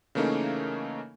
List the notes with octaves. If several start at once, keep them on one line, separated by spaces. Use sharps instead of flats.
C#3 E3 A3 A#3 C#4 D#4